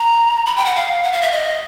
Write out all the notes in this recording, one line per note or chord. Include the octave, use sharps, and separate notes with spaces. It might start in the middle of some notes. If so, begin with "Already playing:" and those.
Already playing: A#5
B5
G5
F#5
F5
F#5
F5
E5
D#5